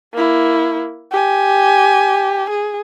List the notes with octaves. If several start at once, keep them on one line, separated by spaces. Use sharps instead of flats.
A#3 E4
G4 G#5
G#4